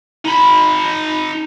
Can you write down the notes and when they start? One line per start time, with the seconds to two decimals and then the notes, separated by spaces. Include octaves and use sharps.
0.25 D#4 B5